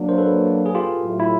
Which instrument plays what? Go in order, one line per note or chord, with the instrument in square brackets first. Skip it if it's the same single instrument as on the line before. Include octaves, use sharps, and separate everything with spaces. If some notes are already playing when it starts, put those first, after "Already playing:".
Already playing: [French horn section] F#3 A#3 D4
[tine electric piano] A#4 C5
A4 B4
G#4
F4 G4
[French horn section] A2 F#3 A3
[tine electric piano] E4